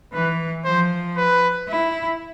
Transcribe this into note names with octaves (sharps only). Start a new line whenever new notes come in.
E3 B4
F3 C5
B4
E4